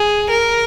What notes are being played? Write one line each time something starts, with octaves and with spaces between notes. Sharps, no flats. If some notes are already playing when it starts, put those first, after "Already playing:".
Already playing: G#4
A#4